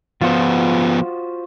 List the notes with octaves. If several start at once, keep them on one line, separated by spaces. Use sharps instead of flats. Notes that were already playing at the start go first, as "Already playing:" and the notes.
F3 B3 F4 F#4 C5